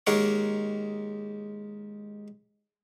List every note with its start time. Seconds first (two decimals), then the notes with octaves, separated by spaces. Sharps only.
0.07 D#2 G#3 A#4 C#5 F#5 D6